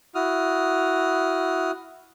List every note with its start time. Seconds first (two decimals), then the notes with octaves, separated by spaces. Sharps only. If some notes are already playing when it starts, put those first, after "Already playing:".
0.15 E4 F#4 D#6 F6